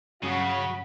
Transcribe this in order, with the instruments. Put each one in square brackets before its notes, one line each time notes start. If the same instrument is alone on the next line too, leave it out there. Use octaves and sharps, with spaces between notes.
[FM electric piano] G2 C#4 D#6 [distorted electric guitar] C#3 [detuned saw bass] F#3 [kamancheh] F#4 B5